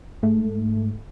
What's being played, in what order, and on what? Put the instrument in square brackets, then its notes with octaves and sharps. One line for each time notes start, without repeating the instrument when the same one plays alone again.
[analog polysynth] G#2 A3